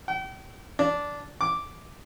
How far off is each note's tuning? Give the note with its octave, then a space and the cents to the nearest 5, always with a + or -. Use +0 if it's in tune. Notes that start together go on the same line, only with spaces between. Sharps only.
G5 -40
D4 -10
D6 -5